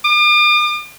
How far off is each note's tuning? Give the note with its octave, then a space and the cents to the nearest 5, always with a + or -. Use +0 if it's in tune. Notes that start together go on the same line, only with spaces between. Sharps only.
D6 +45